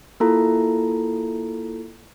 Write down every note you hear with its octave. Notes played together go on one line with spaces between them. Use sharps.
A#3 E4 F4 A4 A#5